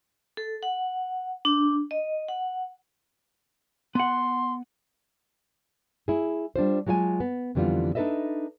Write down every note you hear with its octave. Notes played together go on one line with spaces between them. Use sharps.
A4
F#5
D4
D#5
F#5
B3 F#5 C6
E4 G#4
G3 D4 F4 C5
F#3 G#3 F4 F5 G#5 A5
B3
F2 D3 E3 G3 B3 F4
D4 D#4 A4 B4 D#5 E5